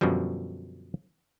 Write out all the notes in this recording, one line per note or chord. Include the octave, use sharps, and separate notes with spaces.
F#2 B2 D3 F3 G3